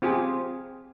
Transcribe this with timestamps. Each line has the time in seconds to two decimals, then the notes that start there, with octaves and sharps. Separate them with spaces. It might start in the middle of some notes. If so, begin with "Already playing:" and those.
0.02 C4 F4 G4 G#4